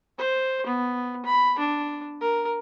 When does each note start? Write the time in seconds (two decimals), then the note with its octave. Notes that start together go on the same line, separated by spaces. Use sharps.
0.18 C5
0.66 B3
1.25 B5
1.59 D4
2.21 A#4